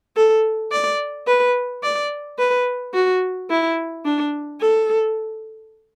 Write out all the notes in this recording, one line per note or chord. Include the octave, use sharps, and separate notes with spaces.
A4
D5
B4
D5
B4
F#4
E4
D4
A4